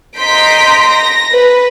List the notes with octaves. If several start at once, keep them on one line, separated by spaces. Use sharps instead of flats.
D#5 A#5 C6 G6 B6 D7
A#6
B4